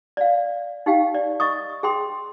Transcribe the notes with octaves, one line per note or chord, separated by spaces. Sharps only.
D5 F5
D#4 G4 F5 G5
D5
D#5 C#6 D#6
G#4 G5 C6 D#6